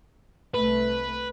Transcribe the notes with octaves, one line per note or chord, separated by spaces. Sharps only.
C2 A3 B4